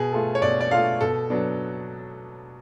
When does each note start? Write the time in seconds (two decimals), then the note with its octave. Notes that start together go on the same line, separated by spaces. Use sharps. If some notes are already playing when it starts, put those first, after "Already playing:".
Already playing: B2 G#4
0.13 A3 F4 A4
0.35 C#5
0.42 B2 D5
0.61 D5
0.71 A3 F4 A4 F5
1.01 B2 A4
1.30 F#3 B3 D4